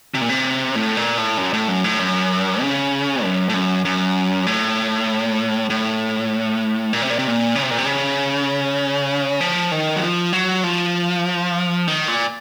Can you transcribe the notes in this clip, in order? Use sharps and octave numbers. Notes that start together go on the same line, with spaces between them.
C3
A#2
C3
A2
A#2
A2
F#2
A2
F#2
A2
F#2
C#3
F#2
A2
F#2
F#2
A2
A2
A#2
C3
A#2
C3
A#2
C#3
C3
A#2
C3
C#3
F3
D#3
F#3
F3
F#3
F3
D#3
A#2